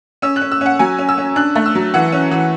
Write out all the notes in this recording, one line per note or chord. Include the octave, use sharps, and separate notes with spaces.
C#4 E6
F#6
C#4
E6
C#4 F#5
F#3 G#5
C#4
E6
C#4
D4 F#6
A3
E6
F#3
E3 F#5
C#4
E3